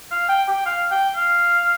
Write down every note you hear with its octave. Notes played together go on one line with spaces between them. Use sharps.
F5
G5
G5
F5
G5
F5